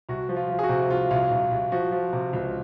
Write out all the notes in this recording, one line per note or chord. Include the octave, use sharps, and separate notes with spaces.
C2 F#4
F3
F4
F3
G#4
F#4
C3
C2 F4
C2 F4
C2
C2
F3 F#4
F3
C3
C#2